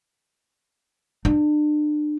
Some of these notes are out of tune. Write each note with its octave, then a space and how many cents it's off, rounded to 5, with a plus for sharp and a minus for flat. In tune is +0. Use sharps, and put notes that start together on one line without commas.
D4 +35